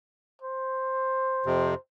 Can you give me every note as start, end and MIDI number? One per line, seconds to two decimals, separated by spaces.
0.42 1.78 72
1.46 1.75 41
1.46 1.75 48